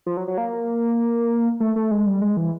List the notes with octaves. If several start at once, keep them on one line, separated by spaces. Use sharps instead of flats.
F3
F#3
F#3
A#3
A3
A3
G#3
G3
G#3
E3